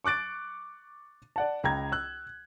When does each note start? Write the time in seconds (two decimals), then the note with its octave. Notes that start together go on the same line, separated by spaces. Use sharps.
0.04 C#6 D6 F#6 A6 D7
1.36 D5 F#5 A5
1.64 C#2 G5 A#5 G#6
1.92 E6 F#6